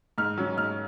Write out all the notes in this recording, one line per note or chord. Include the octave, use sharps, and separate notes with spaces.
G#2 F6
F#3 C#4
G#2 F6